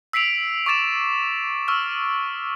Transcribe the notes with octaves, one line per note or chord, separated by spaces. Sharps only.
E6 B6 C7 D7 F7
C#6 D6 A6 E7
C#6 E6 F6